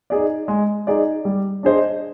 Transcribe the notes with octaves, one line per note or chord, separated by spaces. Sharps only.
D#4 G#4 D5
G#3
D#4 G#4 D5
G3
D4 G#4 C5 D#5